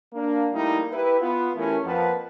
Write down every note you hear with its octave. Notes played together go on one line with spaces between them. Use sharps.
A#3 D4
G3 A3 A#3 D#4 E4
E4 G4 B4
B3 F4
E3 A3 C#4 E4 G4 A#4
F2 F3 A#3 B4 F#5 A5